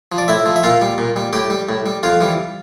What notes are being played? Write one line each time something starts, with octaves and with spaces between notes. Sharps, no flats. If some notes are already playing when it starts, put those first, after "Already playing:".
F3
D5
A2 E4 E5
F3
E5
A#2 F4 F5
G3
A#2
G3
A2 G4 G5
G3
A2
G3
F2 F4 F5
E3 G3